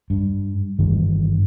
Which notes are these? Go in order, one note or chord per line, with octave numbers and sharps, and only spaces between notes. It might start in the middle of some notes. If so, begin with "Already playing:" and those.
G2
G1 G2 D#3 E3